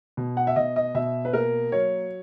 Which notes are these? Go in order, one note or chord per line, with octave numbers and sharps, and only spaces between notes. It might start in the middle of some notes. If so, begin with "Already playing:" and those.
B2
F#5
E5
B2 D#5
D#5
B2 E5
B4
A#3 A#4
F#3 C#5